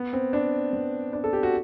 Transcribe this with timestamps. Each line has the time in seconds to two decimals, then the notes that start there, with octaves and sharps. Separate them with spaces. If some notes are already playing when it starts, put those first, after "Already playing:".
Already playing: B3
0.13 C4
0.33 D4
0.73 B3
1.13 D4
1.24 A4
1.33 G4
1.43 F#4